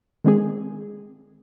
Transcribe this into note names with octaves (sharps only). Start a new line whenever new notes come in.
D#3 G#3 C4 G#4